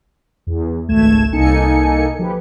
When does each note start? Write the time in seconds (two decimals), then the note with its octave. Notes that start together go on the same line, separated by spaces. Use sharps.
0.47 E2
0.88 G#1 C#2 A3 G#6 E7
1.33 C2 A#3 D#4 A4 G#5 C#7
2.19 F3 G4 B4